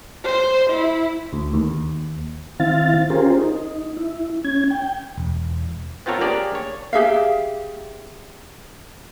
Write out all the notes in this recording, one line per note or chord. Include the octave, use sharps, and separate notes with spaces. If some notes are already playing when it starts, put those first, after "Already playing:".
C5
E4
D2
D#2
D#3 C4 E4 F5 A6
C#4 F4 G4 G#4 A#4 C5
D#4
E4
C#4 G#6
G5
E1
B3 C4 F4 A4 A#4 C#5
A#3 D4 G4 G#4 D5
C#5
G4 G#4 E5 F5